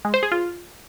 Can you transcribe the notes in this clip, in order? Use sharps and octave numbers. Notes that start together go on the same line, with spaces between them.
G#3
C5
G#4
F4